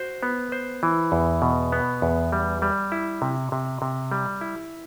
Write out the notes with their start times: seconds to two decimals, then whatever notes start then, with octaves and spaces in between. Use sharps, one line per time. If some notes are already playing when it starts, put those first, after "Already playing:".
Already playing: F#4 C5
0.23 B3
0.52 C5
0.83 E3
1.12 E2
1.42 B2
1.72 B3
2.02 E2
2.32 G3
2.62 G3
2.92 E4
3.22 C3
3.52 C3
3.82 C3
4.11 G3
4.41 E4